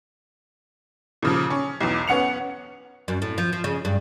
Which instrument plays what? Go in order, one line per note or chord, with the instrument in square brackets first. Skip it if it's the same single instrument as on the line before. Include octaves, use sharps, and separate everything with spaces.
[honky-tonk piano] A#2 C#3 F3
C#4
B1 E2
B3 C#4 F#5 C#7 F7
[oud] F#2
A2
F3
F3
C#3
G2